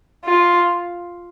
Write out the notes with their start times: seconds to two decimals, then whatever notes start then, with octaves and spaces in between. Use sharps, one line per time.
0.25 F4